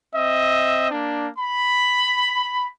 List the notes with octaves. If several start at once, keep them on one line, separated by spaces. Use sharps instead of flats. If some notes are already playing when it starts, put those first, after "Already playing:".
C4 D#5 E5
A#3 D4
B5